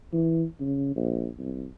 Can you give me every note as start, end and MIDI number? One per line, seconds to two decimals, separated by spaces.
0.13 0.44 52
0.60 0.93 49
0.96 1.28 34
1.38 1.65 36